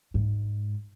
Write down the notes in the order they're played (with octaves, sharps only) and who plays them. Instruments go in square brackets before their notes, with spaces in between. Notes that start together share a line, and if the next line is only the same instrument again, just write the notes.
[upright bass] G#2